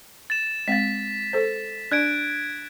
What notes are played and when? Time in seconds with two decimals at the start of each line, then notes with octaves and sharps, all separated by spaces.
0.30 A6 E7
0.68 G#3 C4 F5 A6 B6
1.33 A4 C5
1.91 D4 D5 F#6 G#6 D7